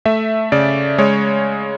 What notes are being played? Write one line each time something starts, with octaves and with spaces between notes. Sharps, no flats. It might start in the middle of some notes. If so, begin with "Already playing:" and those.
A3 E5
C#3 D5
G#3 C#5